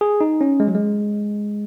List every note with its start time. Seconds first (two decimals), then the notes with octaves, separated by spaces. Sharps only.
0.01 G#4
0.21 D#4
0.41 C#4
0.60 G#3
0.68 F#3
0.75 G#3